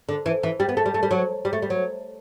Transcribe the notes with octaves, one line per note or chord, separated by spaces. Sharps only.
D3
E3
E3
G3
B3
A3
G3
A3
G3
F#3
G3
A3
G3
F#3